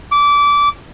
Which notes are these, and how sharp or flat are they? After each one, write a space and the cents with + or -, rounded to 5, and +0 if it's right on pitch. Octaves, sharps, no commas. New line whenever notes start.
D6 -20